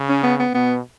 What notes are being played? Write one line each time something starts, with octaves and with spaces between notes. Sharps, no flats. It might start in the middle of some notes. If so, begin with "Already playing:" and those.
Already playing: C#3
C#4
B3
B3
B2 B3